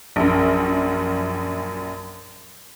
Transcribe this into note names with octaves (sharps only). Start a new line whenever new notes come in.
A#1 F#2